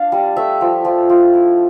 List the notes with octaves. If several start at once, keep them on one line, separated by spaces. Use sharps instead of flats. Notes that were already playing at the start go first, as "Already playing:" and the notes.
Already playing: D4 F5
G3
A3 E5
F3
F3
F3
E4